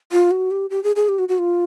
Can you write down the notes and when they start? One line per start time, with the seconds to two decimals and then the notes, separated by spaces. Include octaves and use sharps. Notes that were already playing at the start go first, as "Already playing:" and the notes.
0.12 F4
0.31 F#4
0.51 G4
0.70 G4
0.84 G#4
0.96 G#4
1.09 G4
1.19 F#4
1.29 F#4
1.39 F4